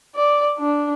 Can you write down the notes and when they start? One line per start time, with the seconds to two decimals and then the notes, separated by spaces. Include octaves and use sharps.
0.15 D5
0.58 D4